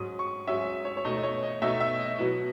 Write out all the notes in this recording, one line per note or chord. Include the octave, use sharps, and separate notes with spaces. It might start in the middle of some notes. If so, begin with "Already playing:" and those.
Already playing: G#2 F#3 C#4 D#6
C#6
G#2 F#3 C#4 E5
C#5
C#5
B2 A3 D#4 D#5
D#5
C#5
D#5
B2 A3 D#4 E5
E5
D#5
B2 F#3 B3 E4